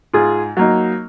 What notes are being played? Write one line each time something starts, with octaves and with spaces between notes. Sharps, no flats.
G#2 F4 G#4
F#3 A#3 D#4